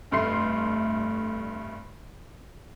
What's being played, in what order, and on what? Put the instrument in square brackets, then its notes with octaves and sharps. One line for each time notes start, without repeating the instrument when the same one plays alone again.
[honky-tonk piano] F1 G2 A3 C6 C7